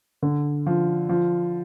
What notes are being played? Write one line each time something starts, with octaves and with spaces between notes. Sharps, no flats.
D3
F3
F3